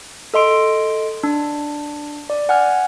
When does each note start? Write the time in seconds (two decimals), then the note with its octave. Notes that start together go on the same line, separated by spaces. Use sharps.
0.34 A4 D#5 C6 D7
1.23 D4
2.30 D5
2.49 F#5 G#5 F6